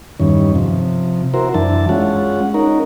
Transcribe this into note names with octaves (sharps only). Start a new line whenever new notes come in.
E2 G2 D#3 C#4
C3 F3
E4 F#4 A#4 C5
F#2 E3 D4 E4 A5
G#3 C#4 F4 F#5
C#4 D#4 A#4